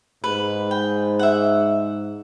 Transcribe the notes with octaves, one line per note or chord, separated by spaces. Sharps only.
G#2 B4
G5
E5 F#5